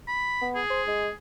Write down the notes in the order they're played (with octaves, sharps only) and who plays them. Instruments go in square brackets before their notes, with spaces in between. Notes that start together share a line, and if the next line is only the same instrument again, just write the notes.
[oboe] B5
[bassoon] B3
[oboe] G#4
[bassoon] C5
G#3